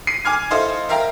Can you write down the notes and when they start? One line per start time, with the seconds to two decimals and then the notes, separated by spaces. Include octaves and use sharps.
0.07 C7 D#7
0.25 G#5 D6 F6 G#6
0.51 E4 A4 C5 D#5 F5
0.89 A#4 E5 F5 G5 A#5